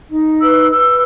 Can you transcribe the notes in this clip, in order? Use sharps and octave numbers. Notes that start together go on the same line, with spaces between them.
D#4
B4 E6
B4 E6